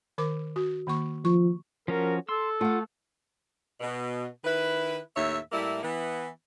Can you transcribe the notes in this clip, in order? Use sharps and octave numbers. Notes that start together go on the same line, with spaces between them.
D#3 A#4 D6
F#4
D#3 A#3 C#6
F3 C#6
F3 C#4 F#4 A#4
A4 C6 E6
A3 F4 F5 F#5
B2
D#3 E4 B4
D#2 A2 C#5 E5
A2 G3 A#3 E4
E3 B3